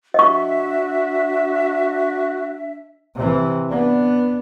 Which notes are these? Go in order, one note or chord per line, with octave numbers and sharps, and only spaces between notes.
D4 F#4 D#5 E5 C#6
C3 E3
B3 D4